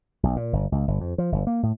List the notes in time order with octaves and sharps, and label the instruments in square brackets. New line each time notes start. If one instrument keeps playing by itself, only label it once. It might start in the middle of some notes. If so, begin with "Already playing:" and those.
[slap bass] B1
A#2
G1
C#2
G1
F2
F3
G1
A#3
A2